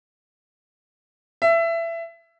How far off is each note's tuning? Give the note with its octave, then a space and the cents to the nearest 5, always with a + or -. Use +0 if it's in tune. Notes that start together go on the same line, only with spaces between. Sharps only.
E5 +20